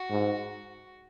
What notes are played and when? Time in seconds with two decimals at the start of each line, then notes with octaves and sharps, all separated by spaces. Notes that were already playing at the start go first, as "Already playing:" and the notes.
Already playing: F#4
0.10 G#2